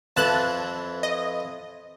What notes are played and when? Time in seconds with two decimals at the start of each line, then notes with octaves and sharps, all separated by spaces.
0.17 F2 E3 A5 F#6
1.03 D#5